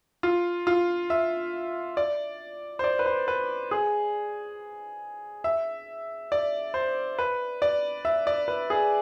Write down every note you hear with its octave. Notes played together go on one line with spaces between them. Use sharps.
F4
F4
E5
D5
C5
D5
B4
C5
B4
G#4
E5
D5
C5
B4
D5
E5
D5
B4
G#4